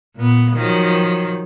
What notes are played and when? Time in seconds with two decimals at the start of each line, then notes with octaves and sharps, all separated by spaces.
0.16 A#2 B3
0.54 D#3 F3 F#3